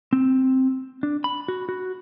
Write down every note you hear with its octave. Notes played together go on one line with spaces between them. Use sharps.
C4
D4
B5
F#4
F#4